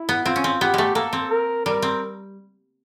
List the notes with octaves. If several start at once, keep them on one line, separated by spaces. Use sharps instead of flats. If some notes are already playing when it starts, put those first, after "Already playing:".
Already playing: E4
B3
C4 F4
C#4
C4
B3 G4
G#3 A3
A#3 A4
C4
A#4
G3 A#4
C4